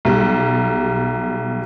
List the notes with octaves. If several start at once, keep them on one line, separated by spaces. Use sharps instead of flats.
B1 G3